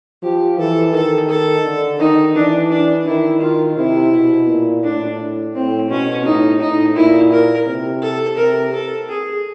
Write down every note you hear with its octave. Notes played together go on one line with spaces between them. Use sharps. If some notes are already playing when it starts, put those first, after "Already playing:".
F3 G4
E3 A4
D#3 A4
A4
D3
D#3 D#4
E3 D4
D4
D#3 E4
D#3 F4
C3 E4
B2
A#2
A2 D4
A2 C4
B2 C#4
A2 D#4
A2 D#4
A#2 E4
A#4
C3
A4
C3 A#4
A4
G#4